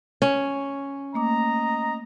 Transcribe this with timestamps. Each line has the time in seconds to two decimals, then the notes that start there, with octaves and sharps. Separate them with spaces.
0.22 C#4
1.14 A3 A#3 D#5 A#5 D6